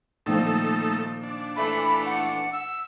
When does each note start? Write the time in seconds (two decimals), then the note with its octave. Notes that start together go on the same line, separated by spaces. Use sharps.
0.26 A#2 D#3 F3 A3 D#4 A4
1.23 D4
1.56 E3 A3 B5
2.06 F#5
2.52 E6